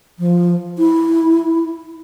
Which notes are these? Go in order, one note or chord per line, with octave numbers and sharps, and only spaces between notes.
F3
E4